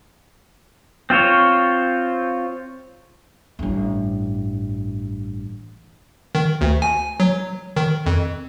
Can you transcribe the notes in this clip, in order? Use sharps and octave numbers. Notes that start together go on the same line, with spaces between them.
C4 F4 C5 C#5
A1 G2
D#3
D2
G#5
F#3
D#3
F2